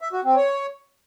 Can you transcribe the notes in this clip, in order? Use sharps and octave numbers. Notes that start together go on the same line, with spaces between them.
E5
F#4
C4
C#5